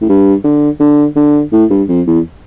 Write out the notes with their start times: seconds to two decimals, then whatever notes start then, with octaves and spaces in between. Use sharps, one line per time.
0.01 A2
0.09 G2
0.44 D3
0.80 D3
1.16 D3
1.52 A2
1.70 G2
1.88 F2
2.07 E2